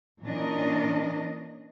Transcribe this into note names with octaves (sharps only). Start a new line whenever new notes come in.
A#2 E3 C#4 D4 A#4 D#5